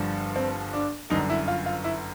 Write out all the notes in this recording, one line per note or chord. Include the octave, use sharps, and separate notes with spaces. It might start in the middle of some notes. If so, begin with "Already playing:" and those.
Already playing: G1 G2 D3 F3
C4
D4
G1 F#2 D3 D#4
E4
F4
F4
E4